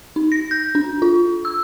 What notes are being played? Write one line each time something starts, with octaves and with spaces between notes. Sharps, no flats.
D#4
A#6
G6
D4
F4
E6